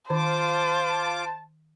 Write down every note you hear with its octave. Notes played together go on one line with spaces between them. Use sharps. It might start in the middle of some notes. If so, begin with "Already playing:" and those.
D#3 F4 C5 A5 D6